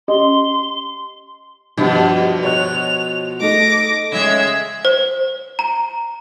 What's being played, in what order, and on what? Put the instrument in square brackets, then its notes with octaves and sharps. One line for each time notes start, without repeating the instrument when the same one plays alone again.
[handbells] C#4 G4 D#5 [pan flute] C6
[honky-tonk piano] G2 [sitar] B2 F3
[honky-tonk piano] C#5 F#6 [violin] F7
[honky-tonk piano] A3 D#4 A4 [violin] D6 A#6
[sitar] C#3 G#3 [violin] E5
[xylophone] C5
A#5